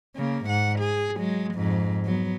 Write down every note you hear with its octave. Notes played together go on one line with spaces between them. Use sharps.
C#3 A#3
G#2 F#5
G#4
F#3 G#3
F2 G#2
F#3 B3